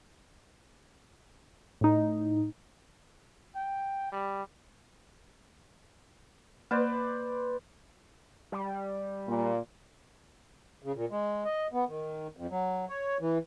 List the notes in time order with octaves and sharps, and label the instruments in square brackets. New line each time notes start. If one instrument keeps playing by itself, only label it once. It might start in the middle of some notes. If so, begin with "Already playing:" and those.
[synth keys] A2 D#4
[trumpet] G5
G3
[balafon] A#3 [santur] B4 C5 D5
[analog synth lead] G3
[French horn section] A#2
[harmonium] C#3
A#2
G#3
D#5
B3
D#3
F2
F#3
C#5
E3